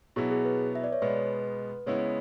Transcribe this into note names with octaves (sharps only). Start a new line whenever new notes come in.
B2 F#3 B3 E4 G#4
G#4
B4
E5
D5
C#5
B2 G#3 B3 B4
C#3 G#3 B3 E4 C#5